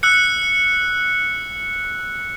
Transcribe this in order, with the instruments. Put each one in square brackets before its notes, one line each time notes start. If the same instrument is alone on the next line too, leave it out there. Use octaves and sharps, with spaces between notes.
[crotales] E6 F#6 C#7